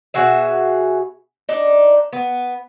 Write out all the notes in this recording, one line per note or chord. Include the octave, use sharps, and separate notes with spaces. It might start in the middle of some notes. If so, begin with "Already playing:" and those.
B2 F#4 G#4 E5
D4 D#4
B3